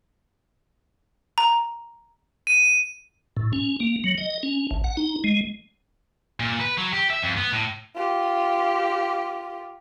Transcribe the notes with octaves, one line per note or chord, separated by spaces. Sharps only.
A#5
D#7
A2
C#4
A#3
F#3
D#5
C#4
A1
F#5
D#4
G#3
A#2
B4
F#3
G4
E5
F2
B3
A2
F4 G4